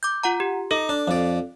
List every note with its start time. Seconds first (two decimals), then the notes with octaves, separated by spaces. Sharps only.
0.03 D6 G6
0.23 F4 F#5 A#5
0.40 G4
0.71 D#4 A4
0.89 D4
1.08 F2 D5